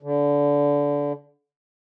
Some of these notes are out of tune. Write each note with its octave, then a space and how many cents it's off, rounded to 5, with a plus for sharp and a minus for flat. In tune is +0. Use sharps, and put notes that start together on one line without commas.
D3 -25